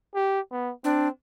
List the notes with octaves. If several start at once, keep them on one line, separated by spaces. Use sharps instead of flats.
G4
B3
C4 D4